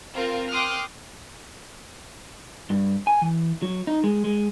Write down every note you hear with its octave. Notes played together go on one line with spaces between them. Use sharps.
C4 F4 A#4
G5 C6 D6 D#6 F6 F#6
G2
G#5
E3
F#3
D#4
G#3
G#3